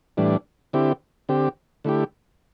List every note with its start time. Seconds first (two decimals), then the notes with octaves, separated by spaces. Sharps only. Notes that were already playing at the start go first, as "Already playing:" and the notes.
0.17 A2 E3 G3 D4
0.73 D3 C4 E4 G4
1.29 D3 C4 G4
1.84 D3 A3 E4 G4